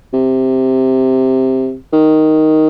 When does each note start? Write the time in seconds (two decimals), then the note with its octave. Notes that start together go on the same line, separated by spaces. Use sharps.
0.14 C3
1.93 D#3